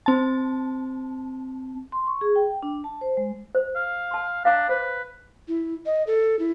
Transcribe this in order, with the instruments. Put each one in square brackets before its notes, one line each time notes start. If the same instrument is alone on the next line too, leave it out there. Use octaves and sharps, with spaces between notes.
[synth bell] C4 A5
[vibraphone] C6
C#6
G#4
G5
D4
A5
C5
G#3
[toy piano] C5
[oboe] F5
[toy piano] A5 C6
[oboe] D4 [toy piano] F5 A#5
[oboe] B4 [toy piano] C5
[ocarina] E4
D#5
A4
E4